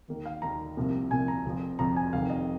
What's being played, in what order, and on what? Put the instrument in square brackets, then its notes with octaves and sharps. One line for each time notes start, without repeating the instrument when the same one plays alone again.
[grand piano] D#2 D#3 A#3
F5
D#2 D#3 A#3 A#5
C2 C3 F3 A#3
C2 C3 F3 A#3 G#5
A#5
F1 F2 F3
F1 F2 F3 A#5
G#5
F1 F2 C3 D#3 F5
D#5